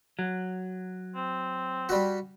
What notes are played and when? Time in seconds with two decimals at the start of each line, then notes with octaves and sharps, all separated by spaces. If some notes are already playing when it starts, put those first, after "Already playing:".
0.19 F#3
1.15 C4
1.89 G3 F#4